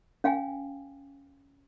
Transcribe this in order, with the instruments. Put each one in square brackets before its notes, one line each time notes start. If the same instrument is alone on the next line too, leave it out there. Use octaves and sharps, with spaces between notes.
[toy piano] C#4 F5 G5 G#5